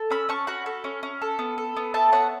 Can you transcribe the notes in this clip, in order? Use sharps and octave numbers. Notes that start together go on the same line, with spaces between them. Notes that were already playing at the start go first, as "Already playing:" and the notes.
Already playing: A4
C#4 B5 E6
C#4 A5 C#6
F#4 F#5 B5
A4
C#4
C#4
A4
B3
A4
B3
A4 E5 A5
B3 C#5 F#5